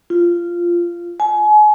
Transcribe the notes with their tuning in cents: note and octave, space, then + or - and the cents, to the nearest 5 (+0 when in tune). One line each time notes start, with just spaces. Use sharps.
F4 -15
G#5 +30